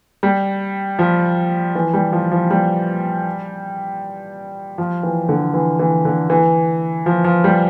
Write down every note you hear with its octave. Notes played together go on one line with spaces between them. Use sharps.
G3
F3
E3
G3
F3
F3
G3
F3
E3
D3
E3
E3
D3
E3
F3
F3
G3